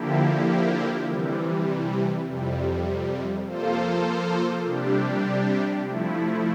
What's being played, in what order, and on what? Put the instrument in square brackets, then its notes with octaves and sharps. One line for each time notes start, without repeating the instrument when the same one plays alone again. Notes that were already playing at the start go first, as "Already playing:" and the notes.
Already playing: [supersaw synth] D3 F3 A#3 E4 G4
C3 E3 G3
F2 C3 G3
F3 A#3 F4 A4 C5
C3 G3 D4 G4
F3 A3 E4